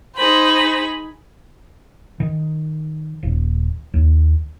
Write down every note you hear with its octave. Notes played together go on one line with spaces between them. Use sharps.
D#4 G#4 C5 B5
D#3
D#1
D#2